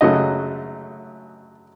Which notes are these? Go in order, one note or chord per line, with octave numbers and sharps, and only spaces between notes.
F#2 C#3 F#3 A3 D#5